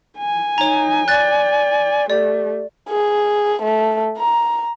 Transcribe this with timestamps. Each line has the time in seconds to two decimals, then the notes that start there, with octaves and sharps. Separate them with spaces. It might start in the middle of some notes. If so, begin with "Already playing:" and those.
0.18 G#5
0.58 D#4 C#5 A#5
1.08 D5 F#6 A6
2.10 A3 G4 D5
2.89 G#4
3.62 A3
4.18 A#5